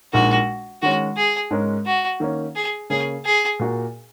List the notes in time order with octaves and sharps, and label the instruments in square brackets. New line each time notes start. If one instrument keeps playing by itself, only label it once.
[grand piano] A#1 A#2 G#3 D#4 A#4 [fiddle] F#4
[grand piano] D#3 G#3 C#4 [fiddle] F#4
[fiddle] G#4
[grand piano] G#2 G#3 C#4 A#4
[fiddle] F#4
[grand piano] D#3 A#3 C#4
[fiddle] G#4
[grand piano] C#3 A#3 C#4 [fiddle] G#4
[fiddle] G#4
[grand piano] A#2 A#3 F#4 A#4